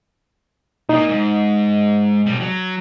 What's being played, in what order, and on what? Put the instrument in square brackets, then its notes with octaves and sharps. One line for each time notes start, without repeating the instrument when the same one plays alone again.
[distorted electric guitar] A#2 A#3 [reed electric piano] D#4
[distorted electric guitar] G#2
B2 G3
F#3